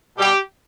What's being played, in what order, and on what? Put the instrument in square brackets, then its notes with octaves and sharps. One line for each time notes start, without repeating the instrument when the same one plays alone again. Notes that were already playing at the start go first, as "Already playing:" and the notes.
[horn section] B2 G3 G4